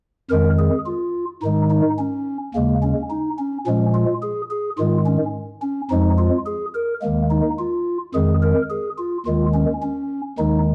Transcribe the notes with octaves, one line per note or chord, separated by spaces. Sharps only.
F2 D#3 G#3 A#4
G#4
F4
G#2 D#3 G#3 D#4
D#4
C#4
D#2 C#3 G#3 A#3
C#4
D#4
C#4
A#2 F3 G#3 C#4
F4
G#4
G#4
G#2 D#3 G#3 F4
C#4
C#4
F2 F3 G#3 D#4
F4
G#4
A#4
D#2 D#3 G#3 A#3
D#4
F4
F2 D#3 G#3 G#4
A#4
G#4
F4
D#2 D#3 G#3 F4
C#4
C#4
D#2 D#3 G#3 D#4